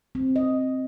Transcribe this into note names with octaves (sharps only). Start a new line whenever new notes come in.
C4
D#5